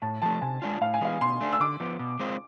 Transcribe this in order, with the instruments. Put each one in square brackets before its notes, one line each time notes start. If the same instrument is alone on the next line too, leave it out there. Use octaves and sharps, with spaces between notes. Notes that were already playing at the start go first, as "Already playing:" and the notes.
[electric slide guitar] A2 [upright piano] A5
[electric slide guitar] F3 A3 [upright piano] A5
[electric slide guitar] C3 [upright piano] G#5
[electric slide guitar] G#3 D4 F4
[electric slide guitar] A2 [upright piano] F5
[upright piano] G#5
[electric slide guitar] E3 G#3 B3 [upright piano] F5
[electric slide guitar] B2 [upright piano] C6
[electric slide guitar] A3 D4
[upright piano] E6
[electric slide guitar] D3 [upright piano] D6
[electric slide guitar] F3 B3
B2
G#3 C4 F4